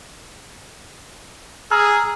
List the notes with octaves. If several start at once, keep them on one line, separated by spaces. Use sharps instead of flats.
G#4 A#5 E6 F6